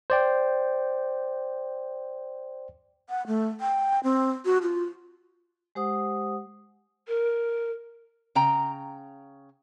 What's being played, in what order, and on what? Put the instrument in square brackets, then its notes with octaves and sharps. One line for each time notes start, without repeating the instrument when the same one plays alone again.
[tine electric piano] C5 D5 G5
[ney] F#5
A3
G5
C4
F#4
F4
[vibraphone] G#3 G4 C5 F#5 D#6
[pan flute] A#4
[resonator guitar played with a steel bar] C#3 G5 A#5